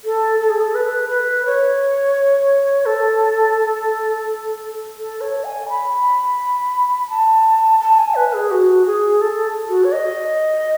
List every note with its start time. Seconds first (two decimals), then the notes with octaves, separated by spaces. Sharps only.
0.05 A4
0.40 A4
0.50 G#4
0.61 A4
0.75 B4
1.09 B4
1.46 C#5
2.86 A4
4.98 A4
5.21 C#5
5.45 G#5
5.69 B5
7.10 A5
7.80 A5
7.98 G#5
8.15 B4
8.34 G#4
8.51 F#4
8.86 G#4
9.21 A4
9.69 F#4
9.84 C#5
9.92 D#5